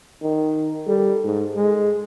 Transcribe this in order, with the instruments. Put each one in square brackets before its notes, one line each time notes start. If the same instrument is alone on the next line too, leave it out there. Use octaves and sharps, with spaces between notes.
[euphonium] D#3
[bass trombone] G3 [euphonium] A4
[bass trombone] G#2
G#3